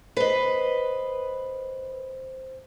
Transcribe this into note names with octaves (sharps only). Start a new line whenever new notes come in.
B4 C5 D#5